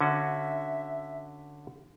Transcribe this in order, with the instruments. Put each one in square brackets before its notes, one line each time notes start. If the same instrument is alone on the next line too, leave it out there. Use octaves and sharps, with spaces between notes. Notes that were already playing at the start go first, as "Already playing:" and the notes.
[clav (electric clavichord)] D3 C#4 F#4 [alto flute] E5